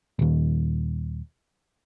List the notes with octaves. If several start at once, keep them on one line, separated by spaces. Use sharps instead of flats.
D#1 D#2